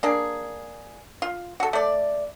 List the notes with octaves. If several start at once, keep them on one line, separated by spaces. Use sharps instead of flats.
A#3 D4 G#4
F4
F#4 A4
A3 D5